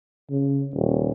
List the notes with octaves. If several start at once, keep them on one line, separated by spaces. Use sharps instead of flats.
C#3
D#1